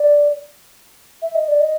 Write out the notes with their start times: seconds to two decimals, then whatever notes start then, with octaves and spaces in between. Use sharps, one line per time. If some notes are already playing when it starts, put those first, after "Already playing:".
Already playing: D5
1.22 E5
1.35 D#5
1.48 D5
1.61 D#5